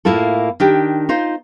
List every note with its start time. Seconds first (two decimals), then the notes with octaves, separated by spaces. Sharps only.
0.05 A2 A#3 E4 F4 A4
0.60 D#3 D4 G4
1.09 D#4 F4 C5